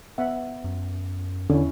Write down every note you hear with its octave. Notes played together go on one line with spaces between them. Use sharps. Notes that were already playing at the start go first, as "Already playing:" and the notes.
B3 E5 F#5
F#2
E2 D3 C#4 E4